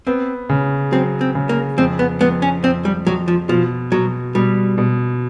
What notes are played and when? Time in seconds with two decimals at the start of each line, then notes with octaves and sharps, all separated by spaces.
0.07 B3 C4
0.49 C#3
0.92 F#3 C4
1.21 C4
1.35 C#3
1.49 A#3
1.78 F2 C4
1.99 B3
2.21 F2 B3
2.42 C#4
2.63 F2 C4
2.85 G3
3.07 F2 F#3
3.28 F3
3.49 B2 F3
3.92 B2 F#3
4.35 B2 G3
4.78 B2